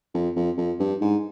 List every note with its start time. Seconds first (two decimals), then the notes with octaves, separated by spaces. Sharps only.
0.14 F2
0.36 F2
0.57 F2
0.79 G2
1.01 G#2